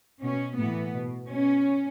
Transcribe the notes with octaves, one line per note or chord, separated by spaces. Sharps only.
B2 C#4
A2 E3 B3
B2
B2 C#4